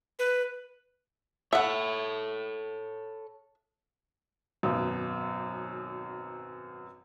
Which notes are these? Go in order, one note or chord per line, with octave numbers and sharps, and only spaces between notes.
B4
A4 C#5 E5 F#5
G#1 F#2 B2 F#3